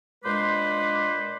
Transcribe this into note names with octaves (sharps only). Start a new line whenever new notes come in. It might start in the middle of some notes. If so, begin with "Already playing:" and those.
A#2 G#3 D4 B4 C5 D6